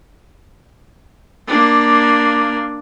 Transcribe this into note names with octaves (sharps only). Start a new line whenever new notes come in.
A#3 D4